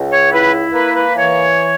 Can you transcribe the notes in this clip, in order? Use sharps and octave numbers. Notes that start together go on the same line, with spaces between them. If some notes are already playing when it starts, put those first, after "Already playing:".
Already playing: C#2
C#5
E4 B4
A#3 B4
B4
E3 C#5